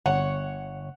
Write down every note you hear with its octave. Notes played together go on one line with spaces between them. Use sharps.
G1 C#5 F#5